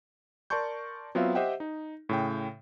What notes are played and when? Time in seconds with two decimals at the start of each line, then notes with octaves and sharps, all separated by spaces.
0.50 A#4 D5 A5 C6 C#6 G6
1.15 F#3 B3 C4 F4 E5 F5
1.35 G4 C5 D#5 E5 F#5 G5
1.60 D#4
2.09 A2 C#3 G5